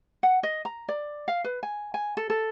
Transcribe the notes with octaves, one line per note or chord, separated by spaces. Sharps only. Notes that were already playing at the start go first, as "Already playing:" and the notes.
F#5
D#5
A#5
D5
F5
B4
G#5
G#5
A4
A4